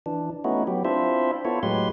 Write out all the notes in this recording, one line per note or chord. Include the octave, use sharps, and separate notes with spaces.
E3 D4
A3 B3 C#4 D#4 E4 F#4
F#3 B3 G4
C4 D4 E4 F4 C5 E5
B3 E4 F4 A4 C#5
A2 F#3 G#3 G4 B4 C6